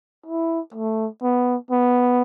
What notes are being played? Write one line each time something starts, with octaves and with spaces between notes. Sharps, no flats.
E4
A3
B3
B3